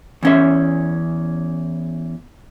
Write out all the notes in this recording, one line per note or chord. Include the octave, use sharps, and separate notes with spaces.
E2 C#4 E5